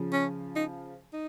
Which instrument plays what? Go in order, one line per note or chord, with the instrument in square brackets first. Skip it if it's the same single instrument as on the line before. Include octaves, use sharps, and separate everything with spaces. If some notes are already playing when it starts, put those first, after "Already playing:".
Already playing: [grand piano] C#3 F3
[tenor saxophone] C#4
D#4
D#4